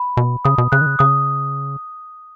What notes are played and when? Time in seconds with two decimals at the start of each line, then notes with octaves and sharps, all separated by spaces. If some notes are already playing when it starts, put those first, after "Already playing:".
Already playing: B5
0.17 B2
0.45 C#3 D#6
0.58 B2
0.72 C#3 F#6
0.81 D#3
0.86 C#3
0.99 C#3 D#6